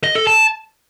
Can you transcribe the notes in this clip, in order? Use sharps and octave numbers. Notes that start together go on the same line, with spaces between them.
D#5
A4
A5